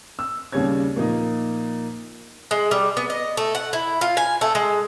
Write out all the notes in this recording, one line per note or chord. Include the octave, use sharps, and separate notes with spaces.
E6
D#2 C#3 G3 C#4 C#5 G#6
A#2 F3 A#3 D#4
G#3
G3
B3
D#5
A3
F#5
E4
F4
G#5
A3
G#3